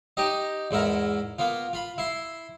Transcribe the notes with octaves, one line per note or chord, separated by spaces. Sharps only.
D#4 G4 D#5
E2 G#2 E4 A#4
A#3 B3 F4
F4 B5
E4 C6